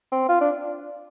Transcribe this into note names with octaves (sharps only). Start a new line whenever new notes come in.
C4
F4
D4